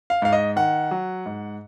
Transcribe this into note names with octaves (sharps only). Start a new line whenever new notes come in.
F5
G#2 F5
D#5
D#3 F#5
F#3
G#2